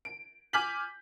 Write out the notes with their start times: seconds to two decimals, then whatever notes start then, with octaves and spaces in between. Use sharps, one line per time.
0.05 D7
0.53 G#5 D6 F6 G6 B6 F#7